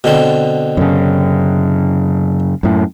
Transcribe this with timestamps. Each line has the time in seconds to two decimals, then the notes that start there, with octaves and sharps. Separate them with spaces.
0.04 B2 D3 C4
0.77 F#2 C#3
2.63 F#2 A2